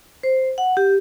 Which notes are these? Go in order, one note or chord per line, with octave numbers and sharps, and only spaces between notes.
C5
F#5
G4